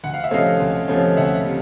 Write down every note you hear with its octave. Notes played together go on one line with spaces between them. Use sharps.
D2 F#5
F5
E5
C3 F3 A3 C#4 D#5 F5
D2
C3 F3 A3 C#4
D2 E5 F#5
C3